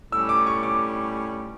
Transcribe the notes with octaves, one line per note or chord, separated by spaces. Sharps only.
A2 G3 C#4 E6
D6
C#6
D6